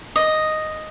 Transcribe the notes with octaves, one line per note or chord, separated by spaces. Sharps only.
D#5